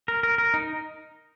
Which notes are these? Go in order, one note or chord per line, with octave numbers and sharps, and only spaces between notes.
A#4
A#4
A#4
D#4